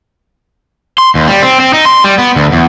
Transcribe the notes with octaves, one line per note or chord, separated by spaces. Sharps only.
C6
D#2
G3
C4
C4
D#4
C6
G3
B3
D2
E2